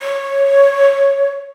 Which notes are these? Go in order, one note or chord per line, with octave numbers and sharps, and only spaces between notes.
C#5